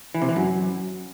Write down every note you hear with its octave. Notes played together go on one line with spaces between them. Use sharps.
E3
C3
E3
F#2